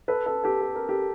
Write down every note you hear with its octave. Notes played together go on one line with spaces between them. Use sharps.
A4 B4
A4 B4
G4 A4
A4
A#4
G4 A4